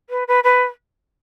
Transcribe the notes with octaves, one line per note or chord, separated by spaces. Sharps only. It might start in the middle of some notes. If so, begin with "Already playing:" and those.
B4
B4
B4